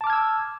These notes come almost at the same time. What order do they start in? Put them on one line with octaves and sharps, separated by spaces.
A5 D6 F6 G#6 E6